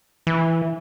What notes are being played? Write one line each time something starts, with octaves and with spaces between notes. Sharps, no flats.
E3